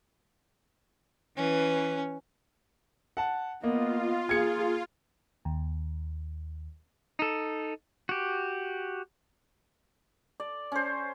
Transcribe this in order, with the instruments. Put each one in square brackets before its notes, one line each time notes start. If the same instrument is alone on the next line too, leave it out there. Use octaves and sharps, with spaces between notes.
[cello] E3 B4 [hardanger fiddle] C#4
[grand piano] F#5 A5
[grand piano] A#3 [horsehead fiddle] B3 D#5 [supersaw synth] F4
[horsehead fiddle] A#3 G#4 [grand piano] G#6 C#7
[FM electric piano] D#2
[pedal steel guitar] D#4 A4
F#4 G4
[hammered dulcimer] D5
C#4 C5